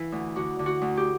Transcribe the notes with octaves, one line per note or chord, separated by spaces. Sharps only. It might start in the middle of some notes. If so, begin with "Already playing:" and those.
Already playing: E3 E4
D2
D3 F#4
D3
F#4
D2
G4